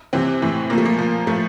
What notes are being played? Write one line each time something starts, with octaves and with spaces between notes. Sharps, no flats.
C3 E3 C4
A2 E3
A#2 F3 A#3
A3
A#3
A#2 F3
A2 F3 A3